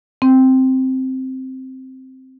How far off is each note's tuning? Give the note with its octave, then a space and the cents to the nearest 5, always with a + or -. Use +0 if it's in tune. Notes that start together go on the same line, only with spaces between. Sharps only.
C4 +0